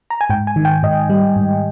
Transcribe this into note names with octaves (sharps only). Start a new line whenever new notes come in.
A#5
G#5
G#2 G5
G#5
D#3
G5
G#2 D#5
G3
G#2